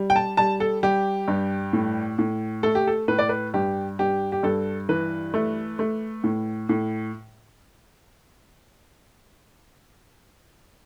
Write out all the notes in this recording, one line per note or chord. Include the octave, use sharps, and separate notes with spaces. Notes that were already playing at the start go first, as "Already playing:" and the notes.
Already playing: G3
G5
A5
G3 A5
A4
G3 G4
G2
A2
A2
A3 A4
G4
A4
A2 B4
D5
B4
G2 G4
G2 G4
G4
G2 A4
E3 B4
A3
A3
A2
A2